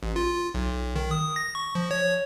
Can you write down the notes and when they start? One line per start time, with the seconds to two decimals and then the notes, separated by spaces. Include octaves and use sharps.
0.03 A1
0.16 F4
0.55 B1
0.95 D#3
1.11 D#6
1.36 A#6
1.55 C#6
1.75 F3
1.91 C#5